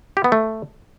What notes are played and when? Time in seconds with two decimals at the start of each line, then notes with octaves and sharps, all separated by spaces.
0.17 G4
0.24 B3
0.32 A3